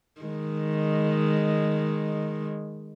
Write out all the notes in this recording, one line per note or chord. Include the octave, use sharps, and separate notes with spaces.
D#3 G#3